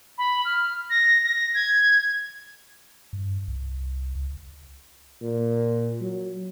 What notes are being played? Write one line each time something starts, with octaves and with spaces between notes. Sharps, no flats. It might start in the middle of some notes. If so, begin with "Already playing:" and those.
B5
F6
A#6
A#6
G#6
G2
C2
C#2
A#2
F#3